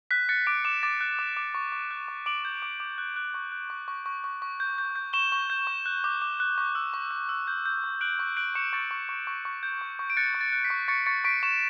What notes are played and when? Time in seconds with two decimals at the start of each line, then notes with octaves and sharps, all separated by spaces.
0.11 F#6 B6
0.29 F#6 A6 C#7
0.47 D6 B6 D7
0.64 D6 C#7 E7
0.83 D6 A6
1.01 F#6
1.19 D6
1.37 D6
1.55 C#6
1.72 C#6
1.91 F#6
2.08 C#6
2.26 D6 D7 F#7
2.45 G6
2.62 D6
2.80 D6
2.98 F#6
3.16 F#6
3.34 C#6
3.52 F#6
3.70 C#6
3.88 C#6
4.06 C#6
4.24 C#6
4.42 C#6
4.60 G6
4.78 G6
4.96 G6
5.13 C#6 E7 G7
5.32 C#6
5.50 G6
5.67 C#6
5.86 F#6
6.04 D6
6.22 D6
6.40 F#6
6.58 C#6
6.75 E6
6.94 C#6
7.11 E6
7.29 E6
7.47 G6
7.66 G6
7.84 C#6
8.01 F#6 D7 F#7
8.19 C#6
8.37 F#6 D7 F#7
8.55 C#6 C#7 E7
8.73 C#6 A6 C#7
8.91 C#6
9.09 C#6
9.27 C#6
9.45 C#6
9.63 G6
9.81 C#6
9.99 C#6
10.10 D7
10.17 F#6 A6 C#7
10.35 C#6
10.41 A6
10.52 F#6
10.64 B6
10.70 C#6
10.88 C#6 A6 C#7
11.06 C#6 A6 C#7
11.24 C#6 B6 D7
11.42 C#6 C#7 E7